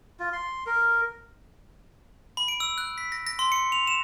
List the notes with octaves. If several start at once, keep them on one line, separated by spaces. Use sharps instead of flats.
F4
C6
A#4
B5
D7
E6
F#6
B6
A#6
A#6
C6
C#7
F7
E7